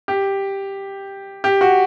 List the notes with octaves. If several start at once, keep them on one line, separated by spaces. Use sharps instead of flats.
G4
G4
F#4